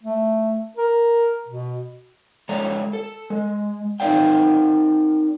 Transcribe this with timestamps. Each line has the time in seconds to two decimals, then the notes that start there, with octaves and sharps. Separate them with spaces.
0.03 A3
0.77 A#4
1.48 B2
2.49 G#3 A4 C#5 D5 A#5
2.93 A4
3.30 G#3
4.00 C4 D#4 A#4 D5 F5 G5